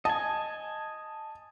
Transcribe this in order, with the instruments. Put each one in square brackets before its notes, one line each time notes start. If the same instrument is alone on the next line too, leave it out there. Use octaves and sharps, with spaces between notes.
[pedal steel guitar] D#5 G#5 [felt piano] A5